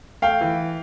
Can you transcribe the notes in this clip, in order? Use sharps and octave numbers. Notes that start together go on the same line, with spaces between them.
A3 F5 G5
E3